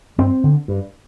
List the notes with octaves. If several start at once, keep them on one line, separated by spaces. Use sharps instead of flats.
G2 C4
D3
G2